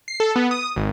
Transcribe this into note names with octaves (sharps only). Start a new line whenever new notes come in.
C7
A4
B3
D#6
G#1